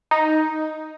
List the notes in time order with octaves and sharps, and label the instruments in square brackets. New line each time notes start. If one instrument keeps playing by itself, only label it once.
[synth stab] D#4